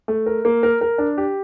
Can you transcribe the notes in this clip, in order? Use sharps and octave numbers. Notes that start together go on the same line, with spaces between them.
A3
A#4
A#3
A#4
A#4
D4
G4